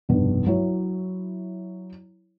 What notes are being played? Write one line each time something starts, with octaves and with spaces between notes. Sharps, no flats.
F1 B1 G2
F#3 E4 C#5